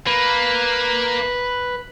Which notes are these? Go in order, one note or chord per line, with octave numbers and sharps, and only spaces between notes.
A#3 B4